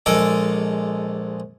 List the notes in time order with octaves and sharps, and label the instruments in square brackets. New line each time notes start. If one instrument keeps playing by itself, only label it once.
[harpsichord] A#1 G#3 A4 D6